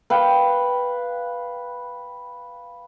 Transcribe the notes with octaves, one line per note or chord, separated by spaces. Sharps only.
B4 F5 G5